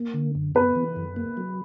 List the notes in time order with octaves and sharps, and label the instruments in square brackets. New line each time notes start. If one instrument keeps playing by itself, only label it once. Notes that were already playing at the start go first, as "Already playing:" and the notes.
Already playing: [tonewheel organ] A#3
D3
F#2
[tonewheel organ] B3 [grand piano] B4
[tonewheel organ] E3
F#2
A#3
F#3